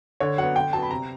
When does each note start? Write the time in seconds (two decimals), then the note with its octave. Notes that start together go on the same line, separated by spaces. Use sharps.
0.20 D3 C#5
0.38 F#3 B3 F#5
0.56 D3 G5
0.73 F#3 B3 A5
0.83 B5
0.91 C3 A#5